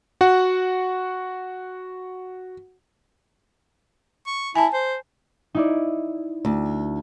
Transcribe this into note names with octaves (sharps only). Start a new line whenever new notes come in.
F#4 F#5
C#6
E4 G#5 A5
C5
D#4 E4 D5
D2